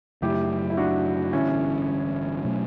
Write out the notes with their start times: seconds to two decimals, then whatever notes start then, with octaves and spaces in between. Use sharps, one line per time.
0.22 F#2 C#3 F#3 A3 E4 G4
0.70 E4
0.77 D4 F#4
1.33 A1 G2 D3 C#4 E4
2.45 B2 F#3 A3